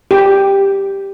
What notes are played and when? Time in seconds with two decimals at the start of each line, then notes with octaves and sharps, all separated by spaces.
0.11 G4